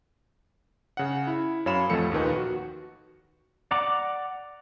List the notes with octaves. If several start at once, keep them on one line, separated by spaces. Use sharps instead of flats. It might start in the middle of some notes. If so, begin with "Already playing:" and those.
C#3 F#5
E4
F#2 C#5 F5 B5 E7
A1 F2 F3 A3 A4 C#7
D#2 A#2 D#3 B4
F#4
D5 F#5 A#5 D6